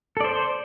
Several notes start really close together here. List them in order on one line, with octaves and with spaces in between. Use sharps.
A4 D5 C5